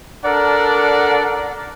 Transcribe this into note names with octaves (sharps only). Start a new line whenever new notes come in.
D4 A4 A#4 D5 F#5